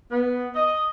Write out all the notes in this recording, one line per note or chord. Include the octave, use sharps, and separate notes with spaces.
B3
D#5